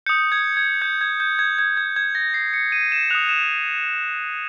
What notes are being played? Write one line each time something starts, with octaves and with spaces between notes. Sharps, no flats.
D#6 G6 C#7
G#6
G#6
G6
G#6
G6
G#6
G#6
G#6
G#6
A#6
C7
C#7
D#7
E7
D#6 F#6 F7
E7